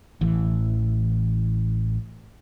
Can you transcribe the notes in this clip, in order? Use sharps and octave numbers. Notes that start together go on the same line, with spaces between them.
A1 E3